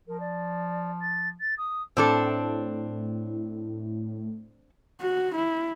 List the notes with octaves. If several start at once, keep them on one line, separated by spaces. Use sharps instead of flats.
F3 A#4
D5
A6
A6
D#6
A2 C4 D4 A4
F#4
E4